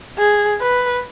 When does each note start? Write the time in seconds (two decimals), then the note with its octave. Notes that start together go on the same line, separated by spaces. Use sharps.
0.18 G#4
0.61 B4